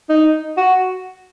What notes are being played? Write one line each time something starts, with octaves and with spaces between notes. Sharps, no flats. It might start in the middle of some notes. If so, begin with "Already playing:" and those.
D#4
F#4